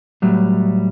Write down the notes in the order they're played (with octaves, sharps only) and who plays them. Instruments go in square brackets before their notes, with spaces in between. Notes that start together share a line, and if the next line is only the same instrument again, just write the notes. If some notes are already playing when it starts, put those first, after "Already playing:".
[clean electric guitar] A2 F#3 G3